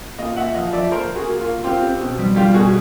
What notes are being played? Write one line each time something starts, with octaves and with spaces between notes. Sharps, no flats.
A#2 D#5 F5
A#2 E5 F#5
F3 D#5 F5
F3 D5 E5
A#3 A#4 C5
A#3
F#4 G#4
A#3
F4
A#3
C4 F4 G4
C4
B2
G3
G3 F4 G4
B2 F#4 G#4